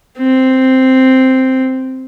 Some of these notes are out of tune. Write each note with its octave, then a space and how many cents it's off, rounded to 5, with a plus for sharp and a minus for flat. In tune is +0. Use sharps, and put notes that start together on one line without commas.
C4 -5